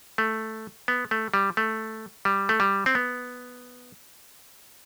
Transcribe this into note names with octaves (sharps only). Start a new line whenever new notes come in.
A3
B3
A3
G3
A3
G3
A3
G3
C4
B3